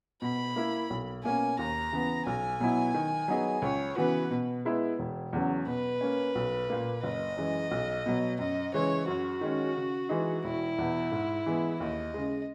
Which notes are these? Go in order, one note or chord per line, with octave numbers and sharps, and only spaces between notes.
B2 B5
A#3 E4
B1
B2 A#3 C#4 G#5
D#2 A#5
C#3 E3 B3
B1 G#5
B2 F#3 B3 E4
D#3
F#3 B3 D#4 G#4
C#2 C#5
C#3 E3 B3 F#4 B4
B2
G#3 B3 E4 B4
E1
E2 C#3 F#3
B2 B4
A#3 C#4
B1
A#2 A#3
F#1 D#5
F#2 E3 G#3
B1
B2 F#3
F#2 D#5
C#3 E3 G#3 C#5
F#2 F#4
D#3 G#3 C#4
C#3
E3 G#3 D#4
E1 E4
E2 B2
G#2
E3 G#3 B3
D#2 D#5
C#3 G#3